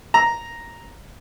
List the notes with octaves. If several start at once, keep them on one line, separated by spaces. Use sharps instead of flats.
A#5